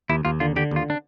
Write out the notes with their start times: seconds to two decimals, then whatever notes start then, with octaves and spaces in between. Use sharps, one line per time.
0.09 D#2 E4
0.25 D#2 F4
0.40 D3 F4
0.56 D3 G4
0.71 D#2 F4
0.90 D4